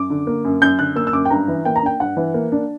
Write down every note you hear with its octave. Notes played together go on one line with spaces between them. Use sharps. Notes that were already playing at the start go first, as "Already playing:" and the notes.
Already playing: F#2 D6
D3
A#3
F#2
F#2 G6
D3 F#6
A#3 E6
E6
F#2 D6
G5
G2 A#5
E3
A#3 G5
A#5
D4 G5
G2 F#5
E3
A#3
D4